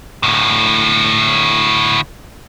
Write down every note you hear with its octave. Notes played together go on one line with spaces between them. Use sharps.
D2 A2